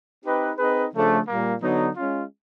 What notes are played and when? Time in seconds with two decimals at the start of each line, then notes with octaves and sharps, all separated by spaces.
0.23 C4 D#4 G4 B4
0.57 C4 D#4 G#4 B4
0.93 C#3 F3 A3 D4
1.26 A#2 G3 A#3
1.61 D3 F#3 B3 D#4
1.96 G#3 C#4 F4